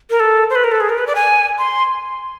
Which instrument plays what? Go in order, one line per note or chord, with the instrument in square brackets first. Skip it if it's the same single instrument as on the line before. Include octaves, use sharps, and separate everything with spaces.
[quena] A#4
A4
C5
B4
A#4
A4
G#4
A#4
B4
D5
G#5
C6